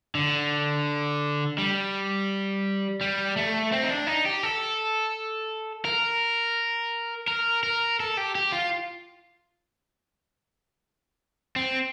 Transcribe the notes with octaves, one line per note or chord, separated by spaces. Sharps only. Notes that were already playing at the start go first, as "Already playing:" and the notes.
D3
G3
G3
A3
C4
D#4
D4
D#4
G4
A4
A#4
A#4
A#4
A4
G4
G4
F4
C4